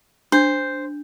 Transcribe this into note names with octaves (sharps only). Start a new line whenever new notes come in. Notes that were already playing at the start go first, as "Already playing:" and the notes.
D4 C5